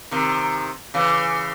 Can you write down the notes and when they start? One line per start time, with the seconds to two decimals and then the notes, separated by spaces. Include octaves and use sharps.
0.11 C3 D#3
0.94 C#3 E3